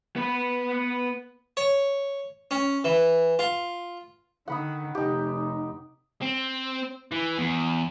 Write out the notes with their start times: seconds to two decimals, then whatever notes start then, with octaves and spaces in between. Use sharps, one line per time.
0.16 B3 B4
1.57 C#5
2.51 C#4
2.84 E3
3.39 F4
4.48 D3 D#3 F#5 B5 D#6
4.95 F1 D#4 G4
6.22 C4
7.12 E3
7.38 E2